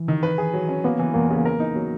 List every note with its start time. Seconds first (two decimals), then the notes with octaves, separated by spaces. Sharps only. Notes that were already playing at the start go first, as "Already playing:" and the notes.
Already playing: E3
0.08 D#3
0.23 B4
0.38 G#4
0.54 F#3
0.69 C#4
0.84 A#3 B3
0.99 E3
1.14 E2 A#3
1.30 C#3
1.45 A#4
1.60 D#4
1.75 F#3